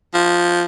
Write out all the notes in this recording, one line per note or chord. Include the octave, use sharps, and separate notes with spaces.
F3